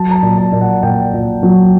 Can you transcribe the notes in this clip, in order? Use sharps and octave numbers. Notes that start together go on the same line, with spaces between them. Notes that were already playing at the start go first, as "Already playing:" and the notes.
Already playing: F#3 A5
A#5
A5
A#2
A5
A#2
F#5
A#2 G5
A#2
F#3